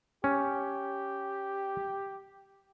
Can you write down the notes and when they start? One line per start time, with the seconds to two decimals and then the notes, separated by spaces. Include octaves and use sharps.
0.24 C#4 G4